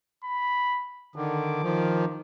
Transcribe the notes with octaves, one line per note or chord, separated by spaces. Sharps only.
B5
D3 D#3 D6
D#3 F3